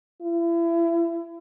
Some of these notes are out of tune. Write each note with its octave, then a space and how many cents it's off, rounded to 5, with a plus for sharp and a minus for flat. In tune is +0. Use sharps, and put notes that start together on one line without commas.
E4 +35